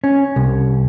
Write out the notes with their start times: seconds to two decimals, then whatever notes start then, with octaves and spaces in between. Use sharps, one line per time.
0.04 C#4
0.36 C2